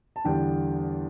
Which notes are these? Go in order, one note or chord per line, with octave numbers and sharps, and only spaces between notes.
A5
E2 D3 G3 D4 G5